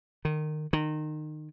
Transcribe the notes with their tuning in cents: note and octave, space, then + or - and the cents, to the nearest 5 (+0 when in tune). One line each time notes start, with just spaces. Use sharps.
D#3 -25
D#3 -25